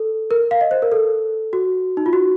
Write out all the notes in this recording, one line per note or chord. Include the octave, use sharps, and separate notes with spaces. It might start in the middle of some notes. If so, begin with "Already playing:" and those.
Already playing: A4
A#4
F5
D#5
C5
A#4
A4
F#4
D#4
F4
F#4